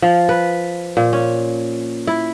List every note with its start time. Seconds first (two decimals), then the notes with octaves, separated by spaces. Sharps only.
0.02 F3
0.29 B4
0.97 A#2
1.13 C#4
2.07 E4